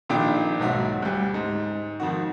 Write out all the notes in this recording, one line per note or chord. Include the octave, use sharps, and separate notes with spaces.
A#1 A#2 D#3 D4 G5 D6
B1 G#2 F#4 E5
D2 G3
G#2
F2 D#3 F#4